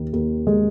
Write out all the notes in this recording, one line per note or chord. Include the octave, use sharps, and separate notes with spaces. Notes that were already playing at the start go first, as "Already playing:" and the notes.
Already playing: D#2 D#3
D#2
G#3